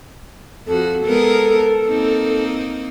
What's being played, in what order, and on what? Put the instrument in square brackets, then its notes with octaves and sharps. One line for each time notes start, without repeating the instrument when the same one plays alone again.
[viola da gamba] F2 F#4 [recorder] A4
[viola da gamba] G#3 B3 A#4
A#3 C4 D#4